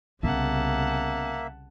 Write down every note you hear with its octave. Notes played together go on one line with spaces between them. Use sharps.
C2 C#3 A#3 B3 C#4 E5 F#5 A5